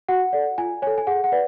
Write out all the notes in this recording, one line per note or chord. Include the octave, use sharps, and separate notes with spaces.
F#4 F#5
A4 D5
F4 G#5
A4 C#5 G#5
G#5
G#4 F#5
F#5
B4 D5